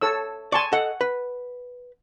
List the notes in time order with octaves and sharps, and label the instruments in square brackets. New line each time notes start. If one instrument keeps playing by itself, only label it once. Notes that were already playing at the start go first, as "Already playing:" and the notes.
[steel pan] A4 C#5 E6
[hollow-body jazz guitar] D5 C6 [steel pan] G#5 A5 C#6
[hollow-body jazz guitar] A4 D#5 [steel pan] F#5
[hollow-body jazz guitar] B4